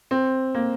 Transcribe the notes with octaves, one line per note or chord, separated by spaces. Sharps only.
C4
A#3